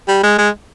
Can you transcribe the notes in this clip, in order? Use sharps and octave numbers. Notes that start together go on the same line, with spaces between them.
G3
G#3
G#3